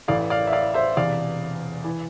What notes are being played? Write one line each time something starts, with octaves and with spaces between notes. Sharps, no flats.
A1 A2 E3 D5 F5
D5 F5
E5
D5 F5
C5 E5
E1 E2 C3 E3 D5 F5
E3